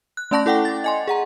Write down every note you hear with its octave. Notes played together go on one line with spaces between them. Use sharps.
F#6
A3 C#4 D5 A5 C#6 A#6
E4 A4 F#5 G5 D6
A6
D#5 G#5 C6
G#4 F#5 A#5